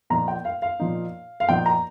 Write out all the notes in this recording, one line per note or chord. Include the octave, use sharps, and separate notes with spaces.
A#2 F3 D#4 A#5
G5
F5
F5
A#2 F3 D#4
F5
A#2 F3 D#4 G5
A#5